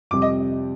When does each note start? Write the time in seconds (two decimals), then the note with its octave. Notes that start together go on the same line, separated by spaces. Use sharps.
0.11 F2 C3 G3 D6
0.22 D#5